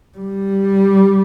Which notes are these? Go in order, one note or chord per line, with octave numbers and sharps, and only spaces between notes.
G3